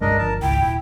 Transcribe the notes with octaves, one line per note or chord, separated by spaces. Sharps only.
B1 G2 G#3 D4 A#4 D#5
G1 F3 A#4 A5
G#1 C#2 E4 G5
D#1 E4